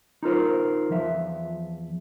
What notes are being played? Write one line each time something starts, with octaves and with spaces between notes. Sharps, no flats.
D#4 F4 A#4 C5
E2 F3 E5